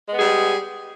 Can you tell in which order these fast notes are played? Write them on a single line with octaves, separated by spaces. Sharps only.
G#3 B3 G#4 G3